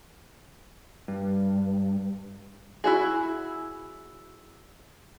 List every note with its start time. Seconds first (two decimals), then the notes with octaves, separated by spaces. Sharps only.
1.08 G2
2.84 E4 F#4 G#4